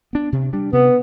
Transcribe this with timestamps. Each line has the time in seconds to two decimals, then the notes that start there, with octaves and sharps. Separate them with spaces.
0.13 B3 D4
0.32 C3
0.53 G3 D4
0.73 C3 B3